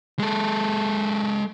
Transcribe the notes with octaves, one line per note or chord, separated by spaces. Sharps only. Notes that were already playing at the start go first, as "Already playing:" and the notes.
G#3 A4